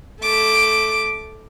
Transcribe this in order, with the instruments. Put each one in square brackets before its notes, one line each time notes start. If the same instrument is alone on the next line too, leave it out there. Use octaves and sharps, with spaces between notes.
[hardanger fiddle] A3 D6